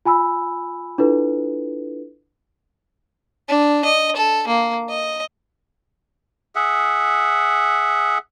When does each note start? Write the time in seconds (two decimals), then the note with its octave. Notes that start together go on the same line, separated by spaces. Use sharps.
0.05 F4 G#5 B5 E6
0.98 D4 E4 F4 A4 B4
3.49 D4
3.85 D#5
4.16 A4
4.47 A#3
4.89 D#5
6.55 G#4 E5 F#5